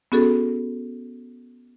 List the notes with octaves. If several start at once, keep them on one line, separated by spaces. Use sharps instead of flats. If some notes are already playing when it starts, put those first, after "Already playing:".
B3 C#4 F#4 G#4 A4